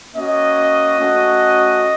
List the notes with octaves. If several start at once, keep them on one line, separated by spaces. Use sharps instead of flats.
A#3 C#4 F#4 D#5
A3 C#4 F#4